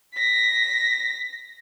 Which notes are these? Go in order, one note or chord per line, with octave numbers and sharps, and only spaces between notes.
A#6 B6